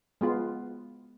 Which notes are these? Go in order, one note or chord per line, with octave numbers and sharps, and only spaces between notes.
G#3 B3 F4